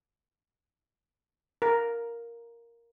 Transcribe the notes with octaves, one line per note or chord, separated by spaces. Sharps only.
A#4